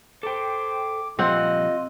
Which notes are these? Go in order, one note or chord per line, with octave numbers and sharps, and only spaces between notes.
A4 C5 G5 D6
A#2 F3 G3 C4 F4 D#5 F#5